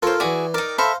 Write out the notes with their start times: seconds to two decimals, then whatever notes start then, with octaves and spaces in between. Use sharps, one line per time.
0.03 F4 A4 A#4 C5 C#5
0.20 E3 E4 F#4 G#4 D5
0.54 D#4 A#4 D5
0.78 A4 C5 E5 F5 A#5 B5